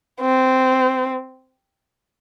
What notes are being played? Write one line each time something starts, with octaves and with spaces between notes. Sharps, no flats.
C4